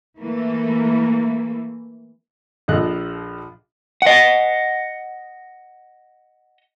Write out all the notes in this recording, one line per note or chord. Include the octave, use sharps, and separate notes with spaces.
E3 A3 A#3
A#1 F3 A4 D#5 F#6
D#5 F#5